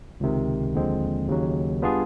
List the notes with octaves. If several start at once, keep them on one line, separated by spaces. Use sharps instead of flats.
C#2 C3 D#3
D#2 D3 F3 G#3 C4
D#2 C#3 F#3
G3 B3 D4 F4 G#4